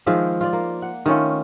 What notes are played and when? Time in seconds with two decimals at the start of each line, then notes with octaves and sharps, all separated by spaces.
0.06 D#3 F3 G#3 E5
0.41 F4 D5
0.53 A#3
0.82 F#5
1.06 D#3 A3 C#4 F4